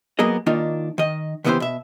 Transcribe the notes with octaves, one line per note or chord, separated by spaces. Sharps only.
F#3 A#3 B3 G#4 D#5
D#3 A#3 D4 D#4 F4
D#3 D#5
C#3 E3 B3 E4 G4 C5
B2 E5